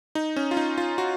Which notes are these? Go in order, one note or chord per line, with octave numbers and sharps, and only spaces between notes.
D#4
C#4
F4
D#4
F4
F#4